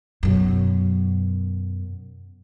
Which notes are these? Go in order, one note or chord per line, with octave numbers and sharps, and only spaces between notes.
F#2 B2